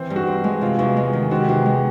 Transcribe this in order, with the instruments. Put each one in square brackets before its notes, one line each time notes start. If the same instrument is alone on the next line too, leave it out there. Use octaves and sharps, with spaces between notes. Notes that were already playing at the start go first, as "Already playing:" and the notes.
Already playing: [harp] E3 C4 [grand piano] C5
[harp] G2
[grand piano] F#4
[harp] C4
G#3
[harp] C3 [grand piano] F4
[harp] E2 [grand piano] F#4
[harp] G#3
D#3
[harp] C3 [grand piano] F#4
[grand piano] G4
[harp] E2 [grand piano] F#4
[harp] G#3